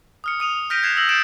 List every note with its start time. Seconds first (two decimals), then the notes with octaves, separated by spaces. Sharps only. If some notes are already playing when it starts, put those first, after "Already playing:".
0.24 D#6 F6 C#7
0.40 D#6 D#7 F7
0.70 F6 G6 A#6 B6 D7 D#7
0.83 F#6 G#6 B6 C7 E7 F7
0.97 E6 G6 A#6 F#7
1.09 E6 G6 A6 C7 D7 E7